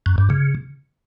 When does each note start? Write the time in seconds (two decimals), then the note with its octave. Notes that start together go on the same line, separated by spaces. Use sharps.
0.06 F#2
0.18 G2
0.30 C#3